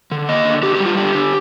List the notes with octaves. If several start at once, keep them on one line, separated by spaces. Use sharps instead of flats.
D3
A#3 D#5
D3
D3 G4
G4
G3
F4
D3 G4
D3